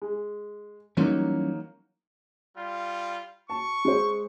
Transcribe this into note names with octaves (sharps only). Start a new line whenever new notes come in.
G#3
E3 F#3 G3 A#3 C#4 D#4
G3 F4
A5 C#6
G#3 C5